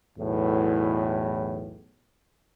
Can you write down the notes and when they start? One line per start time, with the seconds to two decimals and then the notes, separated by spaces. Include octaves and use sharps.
0.19 B1 E2 A2